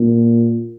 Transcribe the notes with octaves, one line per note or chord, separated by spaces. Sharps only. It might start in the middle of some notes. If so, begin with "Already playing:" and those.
Already playing: A#2